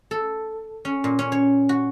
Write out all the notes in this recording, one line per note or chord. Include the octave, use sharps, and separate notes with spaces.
A4
C#4
A#2
C#4
C#5
F#4